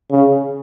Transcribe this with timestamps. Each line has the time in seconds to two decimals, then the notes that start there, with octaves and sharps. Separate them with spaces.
0.11 C#3